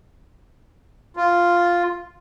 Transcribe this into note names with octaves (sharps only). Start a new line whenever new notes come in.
F4